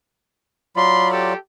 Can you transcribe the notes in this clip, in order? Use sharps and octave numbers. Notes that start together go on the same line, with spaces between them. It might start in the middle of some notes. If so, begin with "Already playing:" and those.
F#3 F4 D5 B5 C6
G4 A4